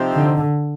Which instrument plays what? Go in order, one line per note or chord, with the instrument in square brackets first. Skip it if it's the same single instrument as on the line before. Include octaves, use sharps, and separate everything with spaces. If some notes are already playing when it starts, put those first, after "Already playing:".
Already playing: [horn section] C3 F3 C4 D#4
[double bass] D3